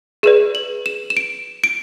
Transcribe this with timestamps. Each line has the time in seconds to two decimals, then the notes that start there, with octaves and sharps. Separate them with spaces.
0.23 G#4 B4 D5 E7
0.55 F#7
0.86 E7
1.10 E7
1.17 D7
1.64 D7